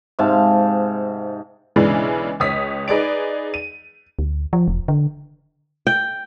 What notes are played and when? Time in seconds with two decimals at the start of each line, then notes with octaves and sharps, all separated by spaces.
0.19 G#2 C3 F5 A5
1.76 B1 C#3 E3 G#3 D4 E4
2.40 C#2 C#5 D#6 B6
2.88 D#4 G#4 B4 D5 D7
3.54 D#7
4.19 D2
4.53 F3
4.68 E1
4.88 D3
5.87 G5